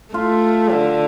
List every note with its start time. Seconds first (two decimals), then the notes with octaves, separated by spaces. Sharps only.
0.14 A3 F4
0.73 D3